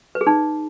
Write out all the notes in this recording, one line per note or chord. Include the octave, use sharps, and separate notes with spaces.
B4
G#4
D#4